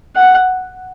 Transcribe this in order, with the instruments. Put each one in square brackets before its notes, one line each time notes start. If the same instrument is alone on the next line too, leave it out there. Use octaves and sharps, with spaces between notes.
[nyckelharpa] F#5